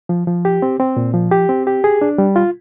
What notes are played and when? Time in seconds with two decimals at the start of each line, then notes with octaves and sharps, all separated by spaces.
0.09 F3
0.27 F3
0.45 G4
0.62 C4
0.80 C4
0.97 A#2
1.14 F3
1.32 G4
1.49 C4
1.67 G4
1.84 G#4
2.02 D4
2.18 G3
2.36 F4